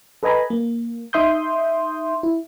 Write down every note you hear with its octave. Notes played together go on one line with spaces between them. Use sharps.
A4 B4 D#5 G#5 A#5 B5
A#3
D#4 E5 C6 D#6 G6
E4